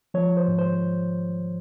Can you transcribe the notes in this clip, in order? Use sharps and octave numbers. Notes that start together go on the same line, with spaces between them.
F3 C#5
C5
G#2
C5